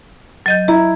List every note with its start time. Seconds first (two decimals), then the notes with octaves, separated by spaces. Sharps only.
0.46 F#3 D#5 G6
0.68 E4 A#5